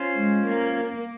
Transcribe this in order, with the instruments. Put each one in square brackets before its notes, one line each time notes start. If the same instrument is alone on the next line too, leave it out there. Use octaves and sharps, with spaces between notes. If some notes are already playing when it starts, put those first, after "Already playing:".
Already playing: [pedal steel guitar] C#4 F4 C5
[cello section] G#3
A#3